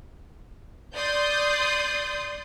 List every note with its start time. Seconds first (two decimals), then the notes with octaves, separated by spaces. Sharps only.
0.95 D5 C6 D#6 G6